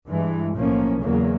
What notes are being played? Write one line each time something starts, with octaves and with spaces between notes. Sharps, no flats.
G2 E3 G#3
B1 A2 F3 A#3 C#4
E2 C#3 F#3 A#3